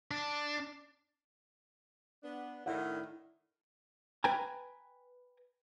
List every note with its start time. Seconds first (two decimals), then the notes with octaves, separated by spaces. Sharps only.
0.11 D4
2.23 B3 D4
2.66 A2 D#3 D4 E4 F#5
4.24 B4 G5 G#5 A#5